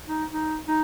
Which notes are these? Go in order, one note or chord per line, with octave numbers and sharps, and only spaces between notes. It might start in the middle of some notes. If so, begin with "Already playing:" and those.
D#4
D#4
D#4